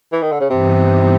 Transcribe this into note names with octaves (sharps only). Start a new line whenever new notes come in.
E3
D#3
D3
C#3
G2 C3 E3 G3 B3 D#4